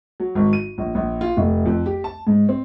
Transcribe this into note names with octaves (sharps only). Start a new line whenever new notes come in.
F#3
G#1
D#7
A#1
A#1
F4
F1
F2
G4
A5
G#2
C4